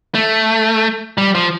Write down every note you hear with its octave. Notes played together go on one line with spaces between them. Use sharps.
A3
G3
F3